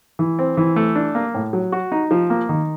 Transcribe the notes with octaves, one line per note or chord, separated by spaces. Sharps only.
E3
C4
E3
A3
D4
A#3
A2
F#3
F#4
D#4
F3
A#3
D#3